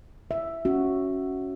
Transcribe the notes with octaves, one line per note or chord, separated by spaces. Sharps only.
E5
C#4 F#4